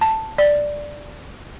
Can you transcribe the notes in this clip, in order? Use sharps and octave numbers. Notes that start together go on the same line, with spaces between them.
A5
D5